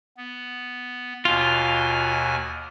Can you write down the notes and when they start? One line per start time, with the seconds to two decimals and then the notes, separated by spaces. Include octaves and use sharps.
0.17 B3
1.25 D#2 B2 F4 G#5